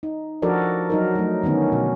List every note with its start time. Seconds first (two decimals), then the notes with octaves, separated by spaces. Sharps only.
0.03 D#4
0.42 F3 D4 F#4 A4 A#4 D5
0.90 F#3 D#4 A#4
1.15 F#3 A3
1.43 D3 D#3 B3 C#4
1.72 B2